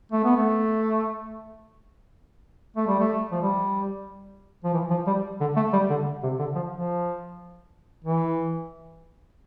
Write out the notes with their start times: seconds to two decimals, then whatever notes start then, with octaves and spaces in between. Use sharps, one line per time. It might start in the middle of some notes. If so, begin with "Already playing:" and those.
0.12 A3
0.24 B3
0.36 A3
2.76 A3
2.87 G3
3.00 A3
3.32 F3
3.42 G3
4.64 F3
4.74 E3
4.90 F3
5.07 G3
5.40 D3
5.56 A3
5.73 G3
5.90 D3
6.23 C3
6.39 D3
6.55 F3
6.72 F3
8.04 E3